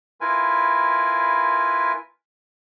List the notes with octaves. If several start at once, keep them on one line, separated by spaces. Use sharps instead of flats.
E4 F4 A#4 B4 G#5